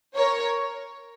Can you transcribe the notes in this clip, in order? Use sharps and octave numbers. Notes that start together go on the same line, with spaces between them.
A#4 C#5